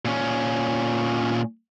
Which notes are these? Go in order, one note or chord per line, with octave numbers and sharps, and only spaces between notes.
A#2 C#4